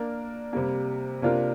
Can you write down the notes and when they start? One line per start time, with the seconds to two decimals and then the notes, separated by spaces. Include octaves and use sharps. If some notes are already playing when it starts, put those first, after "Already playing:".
Already playing: A#3 D4 A#4 D5
0.53 C3 G3 A#3
1.22 C3 A#3 D4 F4 A#4